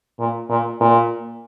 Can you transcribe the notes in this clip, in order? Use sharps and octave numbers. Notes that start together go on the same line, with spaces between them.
A#2
A#2
A#2